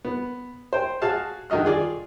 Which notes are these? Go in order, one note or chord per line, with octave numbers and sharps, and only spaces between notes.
B3
C5 G5
F#4 G#4 F5 A5
D3 D#3 F#4 D#5 F6
F4 G#4 D5